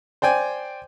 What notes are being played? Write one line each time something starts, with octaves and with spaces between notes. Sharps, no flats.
C5 D5 G5 G#5